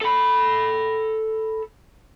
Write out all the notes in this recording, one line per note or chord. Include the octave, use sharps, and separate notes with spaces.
A4 B5